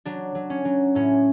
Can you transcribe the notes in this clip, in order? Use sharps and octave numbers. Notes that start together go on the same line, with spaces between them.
F#3 D4
F#3
C#4
F#3
A2 C#4